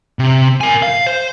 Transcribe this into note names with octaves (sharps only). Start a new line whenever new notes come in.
C3
A#4 G#5
F5
C5